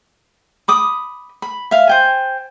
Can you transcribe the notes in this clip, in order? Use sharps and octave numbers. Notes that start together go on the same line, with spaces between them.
B5 D6 D#6
B5
E5 F5
C5 G5 G#5